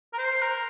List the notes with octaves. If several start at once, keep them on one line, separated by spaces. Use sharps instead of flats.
A#4
C5
A#4